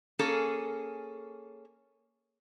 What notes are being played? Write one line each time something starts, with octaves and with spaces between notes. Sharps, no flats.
A#3 C#4 G#4 A4